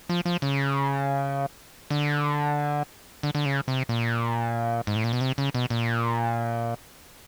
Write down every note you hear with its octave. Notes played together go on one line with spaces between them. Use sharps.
F3
F3
C#3
D3
D3
D3
C#3
C3
A#2
G#2
A2
A#2
B2
C3
C#3
B2
A#2